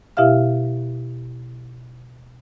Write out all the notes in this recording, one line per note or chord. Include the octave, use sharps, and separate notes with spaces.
B2 E4 G4 E5 F5 F6